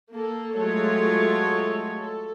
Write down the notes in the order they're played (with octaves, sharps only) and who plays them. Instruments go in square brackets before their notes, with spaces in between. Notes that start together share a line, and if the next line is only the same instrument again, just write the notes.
[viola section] A#3 A4
F#3 G#3 A3 F4 A4 C#5
A4